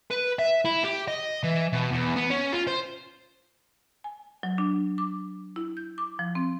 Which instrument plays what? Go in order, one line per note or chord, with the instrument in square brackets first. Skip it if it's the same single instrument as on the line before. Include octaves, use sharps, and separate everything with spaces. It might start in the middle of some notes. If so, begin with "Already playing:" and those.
[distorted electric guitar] B4
E5
E4
G4
D#5
E3
B2
E2
B3
C#4
F4
C5
[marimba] G#5
F#3
D4
D6
E4
G6
D6
F3
C4